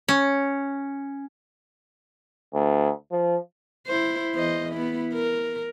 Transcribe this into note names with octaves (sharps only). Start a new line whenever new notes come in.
C#4
D2
F3
E4 C5
E2 C5 D#5
B3 E4
A#4